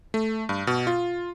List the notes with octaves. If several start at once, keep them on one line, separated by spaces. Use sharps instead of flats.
A3
G2
B2
F4